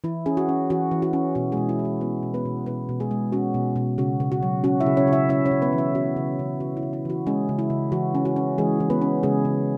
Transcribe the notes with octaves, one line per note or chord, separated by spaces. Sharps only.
E3 E4
C#4 G#4
F#4
C#4
E3 F#4
E3
F#4
C#4
B2 F#4
G#3 G#4
B2
E4
G#3
F#4
B3 F#4
B2
B3 B4
B2
B2 B3 B4
B2
G#3 G#4
G#3
C#4 F#4
B2
B2
C#3 F#4
C#3
F#4
F#3
C#4 F#4
E4 E5
C#3
C#4 C#5
C#3
E4 E5
C#3 E4 E5
C#4 C#5
C#3
B3 B4
E3
E4 E5
C#4 F#4
C#3
C#3
C#3 F#4
E4
C#3
E4
E3 F#4
G#3 C#4 G#4
C#3
E4
C#3
E3 F#4
C#4
F#4
C#4
E3 G#3 G#4
E3
B3 B4
C#4
C#3 G#3 G#4
C#3